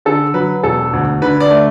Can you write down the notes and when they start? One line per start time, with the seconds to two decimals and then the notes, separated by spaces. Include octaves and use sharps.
0.05 D3 A4
0.34 F#3 B4
0.63 E1 A4
0.93 D2
1.22 D3 B4
1.40 D5
1.50 A3